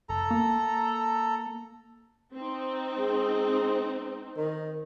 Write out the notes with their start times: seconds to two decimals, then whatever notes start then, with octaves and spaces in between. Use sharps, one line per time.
0.09 F#1 A4 A#5
0.31 A#3
2.35 C4 D#4
2.98 G#3
4.37 D#3